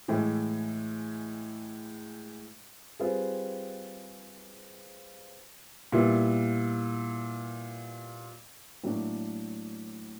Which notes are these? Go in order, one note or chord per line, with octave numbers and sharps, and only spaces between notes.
A2 E3 G#3
G3 C4 F4 G#4 B4
A#2 G3 B3 E4
A2 F#3 A#3 D4